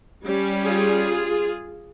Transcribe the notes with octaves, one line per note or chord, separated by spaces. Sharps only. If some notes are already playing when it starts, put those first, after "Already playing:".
G3 C#4
F4 G#4